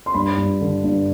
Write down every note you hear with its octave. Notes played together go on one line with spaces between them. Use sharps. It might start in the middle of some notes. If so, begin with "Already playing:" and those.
C6
G2 B5
G2
D3
G2